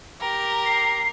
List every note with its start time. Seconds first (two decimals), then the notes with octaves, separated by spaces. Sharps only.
0.20 G4 A#4
0.66 C7